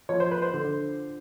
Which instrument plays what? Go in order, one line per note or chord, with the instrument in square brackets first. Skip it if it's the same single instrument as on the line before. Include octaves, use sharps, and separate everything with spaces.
[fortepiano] F3 C#5
C5
B4
C5
D3